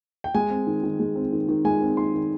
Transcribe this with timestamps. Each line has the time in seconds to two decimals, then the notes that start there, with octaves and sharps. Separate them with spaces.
0.24 G5
0.35 G#3 G#5
0.50 C4
0.67 D#3
0.83 D#3
0.99 G#3
1.16 C4
1.32 D#3
1.48 D#3
1.65 G#3 G#5
1.82 C4
1.97 D#3 C6
2.14 D#3